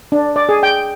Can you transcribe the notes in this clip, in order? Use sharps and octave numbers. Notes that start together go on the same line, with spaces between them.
D4
D5
G#4
G5